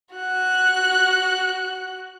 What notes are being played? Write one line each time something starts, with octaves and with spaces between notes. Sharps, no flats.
F#4 F#6